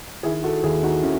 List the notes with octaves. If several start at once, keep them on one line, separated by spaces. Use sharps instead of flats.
D#3 E4 G#4
F#4 A4
D#2 E4 G#4
D#4 F#4
D#3 C#4 E4